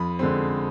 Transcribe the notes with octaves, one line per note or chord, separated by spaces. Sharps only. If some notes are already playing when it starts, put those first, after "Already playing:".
Already playing: F2 B5
D3 G#3 C4